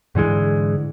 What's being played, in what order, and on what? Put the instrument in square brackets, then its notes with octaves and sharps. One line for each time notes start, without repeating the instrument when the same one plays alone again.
[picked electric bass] G#2 D3 E3 G#3